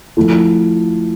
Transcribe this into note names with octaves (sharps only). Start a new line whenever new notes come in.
F3 A3 E4 A4